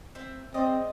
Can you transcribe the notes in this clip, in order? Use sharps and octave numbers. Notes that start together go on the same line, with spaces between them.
C4 E5
G#3 C4 D5 D#5